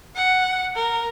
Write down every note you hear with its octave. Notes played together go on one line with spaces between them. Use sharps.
F#5
A#4